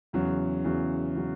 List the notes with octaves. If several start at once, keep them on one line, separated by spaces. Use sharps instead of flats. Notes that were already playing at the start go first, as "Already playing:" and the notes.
E2 C#3 F#3
E2 C#3 F#3
C#3 F#3